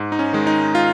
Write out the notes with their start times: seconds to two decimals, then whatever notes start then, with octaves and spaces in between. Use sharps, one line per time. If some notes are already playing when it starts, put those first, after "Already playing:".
Already playing: G#2
0.12 D#4
0.19 C#4
0.33 D#3 G#3
0.47 D#4
0.75 F4